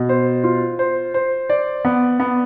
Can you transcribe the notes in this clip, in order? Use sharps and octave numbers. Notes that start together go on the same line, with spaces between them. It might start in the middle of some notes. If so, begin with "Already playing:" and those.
Already playing: B2
C5
F4
C5
C5
D5
B3
B3